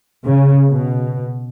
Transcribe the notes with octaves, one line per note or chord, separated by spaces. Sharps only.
C#3
B2